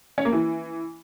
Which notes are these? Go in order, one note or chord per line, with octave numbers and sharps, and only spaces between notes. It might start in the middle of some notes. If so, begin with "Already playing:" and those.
C#4
A#3
E3